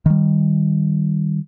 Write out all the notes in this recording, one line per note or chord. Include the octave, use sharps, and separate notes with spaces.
D#3 G3